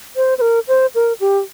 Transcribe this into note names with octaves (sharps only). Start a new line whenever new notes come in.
C5
C5
A#4
C5
A#4
G4